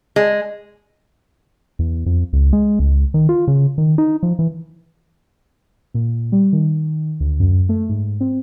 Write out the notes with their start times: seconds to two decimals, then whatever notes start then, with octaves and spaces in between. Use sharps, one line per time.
0.16 G#3
1.79 E2
2.06 F2
2.33 C#2
2.53 G#3
2.79 C#2
3.14 D#3
3.29 F4
3.48 C#3
3.78 D#3
3.98 D#4
4.23 F3
4.39 E3
5.94 A#2
6.32 G3
6.53 D#3
7.20 D2
7.40 F#2
7.69 A3
7.89 G#2
8.20 C4